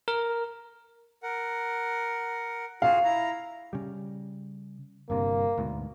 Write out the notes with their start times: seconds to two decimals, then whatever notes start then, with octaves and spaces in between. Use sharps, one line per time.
0.08 A#4
1.23 A#4 F#5
2.82 F4 F#4 G#4 F5
3.04 E4 A#5
3.73 C#3 G3
5.10 G1 G2 C3 A#3
5.58 D2 G#2 B2